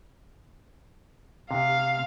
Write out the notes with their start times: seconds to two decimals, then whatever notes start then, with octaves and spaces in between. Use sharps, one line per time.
1.51 C3 F5